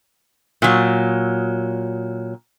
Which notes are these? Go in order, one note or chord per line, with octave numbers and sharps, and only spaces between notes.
A#2 F#3